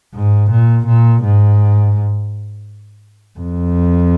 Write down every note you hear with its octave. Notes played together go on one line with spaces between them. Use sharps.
G#2
A#2
A#2
G#2
F2